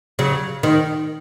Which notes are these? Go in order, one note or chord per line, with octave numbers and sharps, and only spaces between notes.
C#3 F#3
D#3